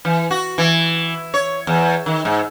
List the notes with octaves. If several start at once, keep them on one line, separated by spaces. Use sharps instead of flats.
E3
F#4
E3
C#5
E2
D#3
G#2